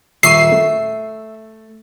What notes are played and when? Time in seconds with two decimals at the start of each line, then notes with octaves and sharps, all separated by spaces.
0.23 D#1 E5 C#6 C7 D#7
0.52 A3